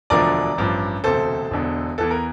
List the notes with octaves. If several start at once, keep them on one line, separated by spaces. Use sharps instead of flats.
E1 D2 D3 F3 A#4 D5
A1 G2 F3
E1 D2 C3 A4 C5
E1 E2 D3
E2 E3 A4
A#4